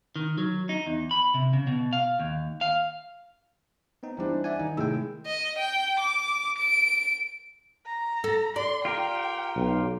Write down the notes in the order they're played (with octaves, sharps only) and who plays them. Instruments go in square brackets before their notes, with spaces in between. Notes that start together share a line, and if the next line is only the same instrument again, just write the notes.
[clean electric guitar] D#3
F#3
D#4
E2
B5
C3
C#3
B2
F5
D#2
F5
[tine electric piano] B3 C4 D#4
[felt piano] E3 G3 D4 [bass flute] C5
[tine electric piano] D5 F#5 G#5 [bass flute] E5
[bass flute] D#3 [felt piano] D#4
[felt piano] A2 G#3 E6 [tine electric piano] C3 G5
[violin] D#5
G5
D6
D7
[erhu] A#5
[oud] A4
[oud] D5 [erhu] C6
[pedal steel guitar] F4 G4 A#4 [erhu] G5
[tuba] B1